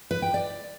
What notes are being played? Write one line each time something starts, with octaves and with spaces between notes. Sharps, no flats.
B4
G5
D5